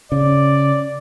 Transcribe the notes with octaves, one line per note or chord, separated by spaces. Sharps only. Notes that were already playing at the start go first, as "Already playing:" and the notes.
C#3 D5